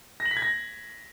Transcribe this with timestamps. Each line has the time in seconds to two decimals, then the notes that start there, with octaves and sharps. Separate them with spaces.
0.20 A#6
0.26 F#7
0.31 B6
0.37 G#6
0.42 A#6